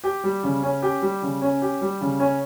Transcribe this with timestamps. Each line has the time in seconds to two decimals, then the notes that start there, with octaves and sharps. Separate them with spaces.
0.04 G4
0.24 G3
0.43 C#3
0.63 C#4
0.82 G4
1.02 G3
1.22 C#3
1.42 C#4
1.62 G4
1.81 G3
2.01 C#3
2.20 C#4